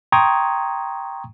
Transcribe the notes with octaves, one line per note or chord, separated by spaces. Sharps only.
G5 A#5 C6 C#6 D#6 G#6